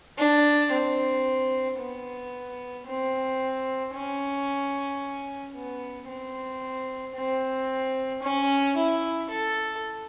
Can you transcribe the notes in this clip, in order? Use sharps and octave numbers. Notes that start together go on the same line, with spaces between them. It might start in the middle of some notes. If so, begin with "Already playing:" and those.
D4
C4
B3
C4
C#4
B3
C4
C4
C#4
E4
A4